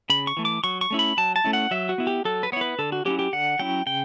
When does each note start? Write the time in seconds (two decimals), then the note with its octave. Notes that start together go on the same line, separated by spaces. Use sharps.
0.10 C#3 B5
0.27 C#6
0.37 E3 A3
0.45 D6
0.64 F#3 C#6
0.81 C#6
0.91 A3 C#4 E4
0.99 B5
1.17 F#3 A5
1.36 A5
1.44 A3 C#4 E4
1.53 F#5
1.71 F#3 E5
1.89 F#4
1.98 B3 E4
2.07 G4
2.25 F#3 A4
2.43 B4
2.52 B3 C#5
2.57 E4 B4
2.79 D3 A4
2.92 F#4
3.05 F#3 C#4 E4 G4
3.19 G4
3.33 D3 F#5
3.59 F#3 C#4 E4 G5
3.86 C#3 G5